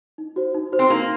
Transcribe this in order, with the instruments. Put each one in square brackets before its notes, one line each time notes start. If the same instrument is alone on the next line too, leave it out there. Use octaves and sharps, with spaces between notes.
[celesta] D#4
F#4 C5
D#4
F#4 C5
[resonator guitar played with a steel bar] C4
[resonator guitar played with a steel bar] A#3 [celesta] D#4